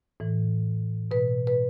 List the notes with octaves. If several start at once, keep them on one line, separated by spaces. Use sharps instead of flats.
A2 E3
B2 B4
B4